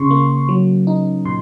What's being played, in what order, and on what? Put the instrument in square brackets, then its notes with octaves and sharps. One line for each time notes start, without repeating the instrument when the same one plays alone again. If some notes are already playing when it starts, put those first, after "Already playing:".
Already playing: [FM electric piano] C#3 C6 C#6
A#3
F#3
D#4
A#2 C6